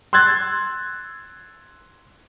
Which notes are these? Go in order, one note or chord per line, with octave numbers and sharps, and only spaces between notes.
C6 E6 F#6 G#6 A6